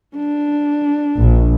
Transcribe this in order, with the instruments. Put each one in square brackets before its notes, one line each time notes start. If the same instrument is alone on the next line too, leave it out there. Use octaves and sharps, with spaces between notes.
[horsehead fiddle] D4
[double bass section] A#1